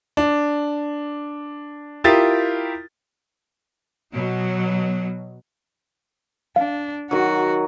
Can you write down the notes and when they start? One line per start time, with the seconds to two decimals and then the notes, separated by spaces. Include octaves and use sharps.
0.17 D4
2.04 E4 F4 G4 A#4 D#6 A6
4.13 B2 F#3
6.56 D4 F5
7.11 D#3 F#3 F#4